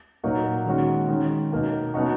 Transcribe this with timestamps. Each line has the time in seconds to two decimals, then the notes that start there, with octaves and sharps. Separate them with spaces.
0.24 A#2 F#3 A#3 D#4 F#4
0.66 D#3 G#3 C#4 F#4
1.08 D#3 G#3 C#4
1.52 B2 A#3 D#4
1.94 B2 F#3 B3 D#4 F#4